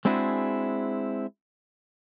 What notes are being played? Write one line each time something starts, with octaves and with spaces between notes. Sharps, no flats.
G#3 C4 D4 E4 F#4 G#4